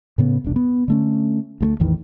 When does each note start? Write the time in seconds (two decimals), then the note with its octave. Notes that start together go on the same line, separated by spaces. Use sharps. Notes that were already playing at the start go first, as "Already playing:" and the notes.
0.18 A2 C#3 B3
0.44 E1 C2 D4
0.56 B3
0.88 D3 A3 C#4
1.61 D2 G3 A3
1.80 A1 E2 D#3 E3